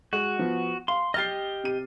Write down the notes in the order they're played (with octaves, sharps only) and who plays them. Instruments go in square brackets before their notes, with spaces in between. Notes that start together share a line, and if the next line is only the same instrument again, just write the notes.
[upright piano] G#3 [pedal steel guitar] F#4
[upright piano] F3 B3
[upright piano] F5 [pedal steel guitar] C6
[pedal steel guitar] G4 D#5 [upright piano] F6 A6 C7
[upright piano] C3 D#7